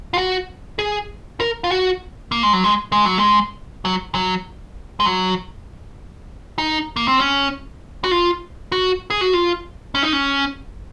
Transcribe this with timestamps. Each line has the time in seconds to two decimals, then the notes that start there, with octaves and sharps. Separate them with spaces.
0.14 F4
0.18 F#4
0.79 G#4
1.40 A#4
1.64 F4
1.71 F#4
2.32 A#3
2.43 G#3
2.53 F#3
2.64 G#3
2.92 G#3
3.05 F#3
3.18 G#3
3.85 F#3
4.15 F#3
5.00 G#3
5.06 F#3
6.58 D#4
6.96 A#3
7.08 C4
7.20 C#4
8.04 F#4
8.11 F4
8.72 F#4
9.10 G#4
9.21 F#4
9.33 F4
9.95 C#4
10.03 D#4
10.13 C#4